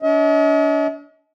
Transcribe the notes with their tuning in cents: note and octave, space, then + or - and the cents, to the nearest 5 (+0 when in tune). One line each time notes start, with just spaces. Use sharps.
D4 -45 D#5 +45